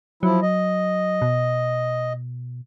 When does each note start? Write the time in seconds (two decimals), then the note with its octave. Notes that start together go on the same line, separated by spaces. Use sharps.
0.23 F3 F#3 E4
0.42 D#5
1.22 B2